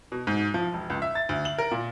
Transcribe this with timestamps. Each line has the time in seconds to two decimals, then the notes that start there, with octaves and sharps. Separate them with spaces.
0.12 B2
0.27 G#2
0.54 F3
0.74 E1
0.90 C#2
1.02 E5
1.15 A6
1.29 D2
1.45 F#7
1.59 A#4
1.71 A#2